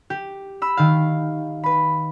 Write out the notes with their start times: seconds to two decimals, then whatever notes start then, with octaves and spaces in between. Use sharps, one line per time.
0.10 G4
0.62 B5 E6
0.77 D#3 F5
1.64 B4 B5